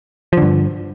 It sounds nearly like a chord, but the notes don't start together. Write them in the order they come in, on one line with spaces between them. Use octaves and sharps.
F3 D3 G2